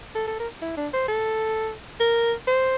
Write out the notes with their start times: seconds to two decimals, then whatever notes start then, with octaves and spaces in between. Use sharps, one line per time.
0.15 A4
0.27 A4
0.39 A#4
0.61 E4
0.77 D4
0.93 C5
1.08 A4
2.00 A#4
2.47 C5